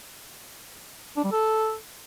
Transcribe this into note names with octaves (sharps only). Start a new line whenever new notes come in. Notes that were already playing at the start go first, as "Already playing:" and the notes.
D4
G3
A4